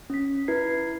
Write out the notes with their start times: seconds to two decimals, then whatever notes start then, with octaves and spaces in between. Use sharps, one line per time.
0.10 C#4 B6
0.48 E4 B4 G#6 C7